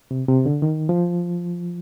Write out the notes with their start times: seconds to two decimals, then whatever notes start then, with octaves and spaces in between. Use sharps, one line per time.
0.11 C3
0.28 C3
0.46 D3
0.62 D#3
0.89 F3